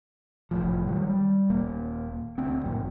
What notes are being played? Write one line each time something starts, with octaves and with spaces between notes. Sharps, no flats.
F1 C#2 A2 F3
D#3 F#3 G3
G3
D#1 A#3
D2 C4
G#1 F#2 A#2